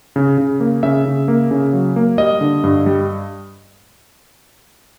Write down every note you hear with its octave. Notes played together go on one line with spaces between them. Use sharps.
C#3
C#3
A#3
C#3 E5
C#3
A#3
C#3
F#3
A#3
G3 D#5
D3
G2
G3